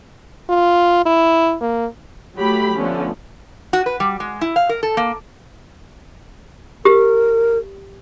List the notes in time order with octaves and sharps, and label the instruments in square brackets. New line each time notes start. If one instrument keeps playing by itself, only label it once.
[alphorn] F4
E4
A#3
[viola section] F#3 A3 G4 B5
D3 F3 A3 B3 C#4
[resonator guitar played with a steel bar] F#4
B4
G3
G#3
E4
F5
A#4
A4
A#3
[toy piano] G4 [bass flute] A#4